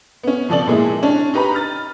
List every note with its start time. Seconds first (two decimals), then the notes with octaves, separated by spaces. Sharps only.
0.23 B3 C#4
0.49 B2 F3 A4 D5 F#7
0.67 A#2 G#3 E4
1.03 C#4 D4
1.34 D#4 G4 B4 A#5 B5
1.54 F6 A6